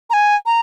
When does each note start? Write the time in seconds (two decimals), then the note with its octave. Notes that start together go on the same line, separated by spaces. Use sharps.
0.10 A#5
0.13 G#5
0.46 A#5